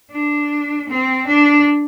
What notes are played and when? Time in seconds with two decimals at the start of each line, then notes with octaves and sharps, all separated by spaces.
0.12 D4
0.89 C4
1.27 D4